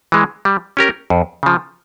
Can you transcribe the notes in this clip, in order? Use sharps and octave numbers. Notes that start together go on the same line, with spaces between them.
E3 G#3
G3
C#4 G4 A#4
F2
C#3 F3